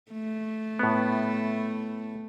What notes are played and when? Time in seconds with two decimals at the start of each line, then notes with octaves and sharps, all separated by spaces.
0.12 A3
0.79 A2 B3